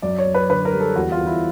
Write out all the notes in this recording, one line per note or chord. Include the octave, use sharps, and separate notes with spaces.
F#2 D5
C#5
F#2
B4
D3 B4
A#4
G3
A4
E2 F#4
F4
E2
E4